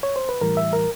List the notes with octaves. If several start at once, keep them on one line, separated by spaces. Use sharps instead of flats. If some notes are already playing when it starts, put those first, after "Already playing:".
C#5
C5
B4
A2 E3 G3 A#4
E5
A#4